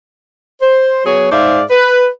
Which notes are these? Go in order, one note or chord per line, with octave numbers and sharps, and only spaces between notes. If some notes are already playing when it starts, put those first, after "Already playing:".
C5
F#3 B3 G#4 C#5
G#2 G#4 C5 D5 E5 F5
B4